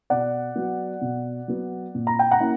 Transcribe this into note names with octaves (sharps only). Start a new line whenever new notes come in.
B2 D5 F#5
F#3 B3
B2
F#3 B3
A#2
A#5
G5
F#5 A#5
A#3 C#4 E4